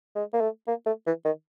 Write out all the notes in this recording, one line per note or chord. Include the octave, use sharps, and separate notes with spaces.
G#3
A#3
A3
A#3
A3
E3
D#3